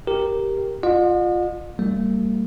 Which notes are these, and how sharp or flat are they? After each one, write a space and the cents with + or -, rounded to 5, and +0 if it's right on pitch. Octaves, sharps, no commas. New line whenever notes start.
G4 +0 A#4 +0
F4 +5 D#5 -40 F#5 -45
G3 -5 A#3 -45